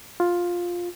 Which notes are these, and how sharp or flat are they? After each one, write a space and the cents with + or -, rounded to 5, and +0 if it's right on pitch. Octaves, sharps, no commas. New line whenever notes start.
F4 +10